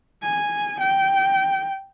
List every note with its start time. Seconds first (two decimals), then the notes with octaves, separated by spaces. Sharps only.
0.22 G#5
0.80 G5